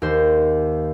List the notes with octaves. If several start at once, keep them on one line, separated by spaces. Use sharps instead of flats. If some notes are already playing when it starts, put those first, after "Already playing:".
D#2 C5